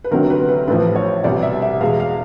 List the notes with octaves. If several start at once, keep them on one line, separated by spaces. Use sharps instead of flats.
B4
D2 C3 D#3 F#3 A#4
B4
B4
A1 A2 F3 B4
C#5
C2 B2 G3 D5
E5
E5
E2 B2 G#3 F5
F5